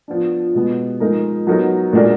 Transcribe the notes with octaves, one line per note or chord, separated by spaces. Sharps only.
F3 B3 D4
B2 G#3 B3
F3 G#3 D#4 A#4
F#3 B3 D#4 F#4 A#4
A#2 G#3 D4 F#4 A#4